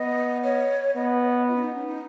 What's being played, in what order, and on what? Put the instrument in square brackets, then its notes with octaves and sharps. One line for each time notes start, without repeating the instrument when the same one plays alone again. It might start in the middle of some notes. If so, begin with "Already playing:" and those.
Already playing: [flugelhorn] B3 [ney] D#5
[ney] C#5
[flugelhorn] B3 [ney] D#5
[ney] F4
C#4
D#4
C#4
D#4